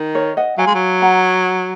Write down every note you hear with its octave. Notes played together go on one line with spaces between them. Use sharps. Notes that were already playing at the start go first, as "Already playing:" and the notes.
Already playing: D#3
A#4 C#5
D#5 F#5
F#3 F5 G#5
G#3
F#3
F#5 A#5